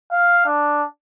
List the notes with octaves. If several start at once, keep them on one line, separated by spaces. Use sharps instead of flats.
F5
D4